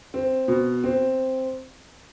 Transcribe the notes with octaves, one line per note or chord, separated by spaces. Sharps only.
C4
B2
C4